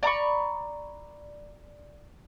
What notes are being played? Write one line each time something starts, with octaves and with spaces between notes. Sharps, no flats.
D5 A#5 B5 C#6